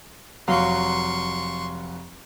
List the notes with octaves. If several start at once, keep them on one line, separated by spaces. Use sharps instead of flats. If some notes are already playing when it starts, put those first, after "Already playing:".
F1 F#3 F5 C6 C#6